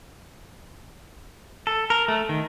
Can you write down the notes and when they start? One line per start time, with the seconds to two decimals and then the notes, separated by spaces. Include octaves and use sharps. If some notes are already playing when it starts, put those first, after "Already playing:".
1.67 A4
1.90 A#4
2.08 A3
2.29 D#3